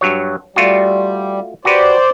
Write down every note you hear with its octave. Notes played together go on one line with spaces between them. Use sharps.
G2 F#3 C#5
G3 A3 F4 F#4
F#4 G4 B4 C5 D5